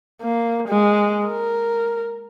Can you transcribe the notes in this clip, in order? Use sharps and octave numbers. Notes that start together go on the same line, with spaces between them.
A#3
G#3
A#4